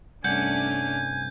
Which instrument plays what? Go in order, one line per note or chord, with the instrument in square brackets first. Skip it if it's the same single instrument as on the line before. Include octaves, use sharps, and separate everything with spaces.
[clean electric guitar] C2 G2 F#5 [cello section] A3 C#4 D4 [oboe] G#5 [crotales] G6